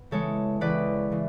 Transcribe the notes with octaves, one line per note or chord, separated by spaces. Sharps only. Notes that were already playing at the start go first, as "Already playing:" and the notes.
Already playing: B3
C#3 E3 G#3 A4 C#5
C#2 C#3 E3 B4 D5
C#3 E3